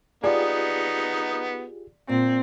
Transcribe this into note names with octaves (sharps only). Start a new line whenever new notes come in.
B3 D#4 F4 G4 G#4 D5
A#2 C4